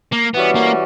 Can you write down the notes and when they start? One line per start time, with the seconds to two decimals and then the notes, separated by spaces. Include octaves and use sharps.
0.13 A#3
0.34 E3 G3 B3 C#4 F#4
0.56 A#3